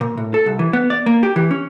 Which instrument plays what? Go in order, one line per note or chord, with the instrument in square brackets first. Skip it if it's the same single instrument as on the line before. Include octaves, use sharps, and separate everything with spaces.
[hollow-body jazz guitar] A#2
A2
A4
C2
E3
B3
D5
A#3
G4
E3
C#4